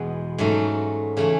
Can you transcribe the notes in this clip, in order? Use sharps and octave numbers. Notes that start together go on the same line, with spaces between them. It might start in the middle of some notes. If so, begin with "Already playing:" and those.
Already playing: E2 B2 G#3 B3
G#2 F#3 A3 C#4
C#3 E3 A3 C#4